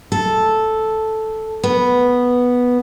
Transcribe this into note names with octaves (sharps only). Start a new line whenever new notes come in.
A4
B3